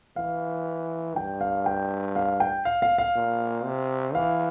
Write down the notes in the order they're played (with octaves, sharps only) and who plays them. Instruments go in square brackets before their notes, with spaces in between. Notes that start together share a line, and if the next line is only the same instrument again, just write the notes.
[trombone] E3 [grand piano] F5
[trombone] G2 [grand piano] G5
[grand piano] F5
G5
F5
G5
F5
F5
F5
[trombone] A#2
C3
[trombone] E3 [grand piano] F5